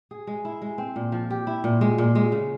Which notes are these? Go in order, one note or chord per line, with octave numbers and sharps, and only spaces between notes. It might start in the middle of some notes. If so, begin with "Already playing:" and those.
G#4
G#3
E4
G#3
C4
A#2
F3
G4
E4
A#2
G#3
A#2
G#3
C#3